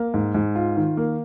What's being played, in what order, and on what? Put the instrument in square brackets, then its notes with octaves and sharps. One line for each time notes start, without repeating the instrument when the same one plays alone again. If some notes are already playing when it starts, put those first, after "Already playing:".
Already playing: [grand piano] A#3
G#2
G#2
F4
D#3
A#3